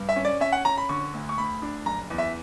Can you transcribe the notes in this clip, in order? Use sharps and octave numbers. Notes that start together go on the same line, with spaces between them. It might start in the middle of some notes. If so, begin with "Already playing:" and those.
Already playing: G2
E5
C#4
D5
C#4 E5
F#5
C#4 A#5
B5
D3 C#6
D2
C#6
D2 B5
D4
F#1 A#5
E2
E5